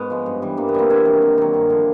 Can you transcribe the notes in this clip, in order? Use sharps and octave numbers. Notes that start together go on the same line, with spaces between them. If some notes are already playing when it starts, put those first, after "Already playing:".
Already playing: G#2 B3 C#4
F3 G#3
G2
E3 G3
G2 A#3
B3
E3 G3 A#3 C4
C3 D4 E4
D#3 F#3
C3
D#3 F#3
G2
D3 F3